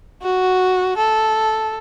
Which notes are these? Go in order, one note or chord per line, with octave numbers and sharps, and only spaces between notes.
F#4
A4